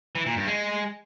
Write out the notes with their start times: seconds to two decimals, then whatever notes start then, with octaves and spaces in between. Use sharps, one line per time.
0.15 E3
0.26 A#2
0.36 G2
0.47 G#3